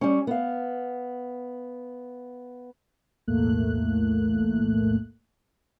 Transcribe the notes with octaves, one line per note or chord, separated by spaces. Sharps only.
G3 C#4
B3 F5
B1 E2 A2 A3 A#3 F#6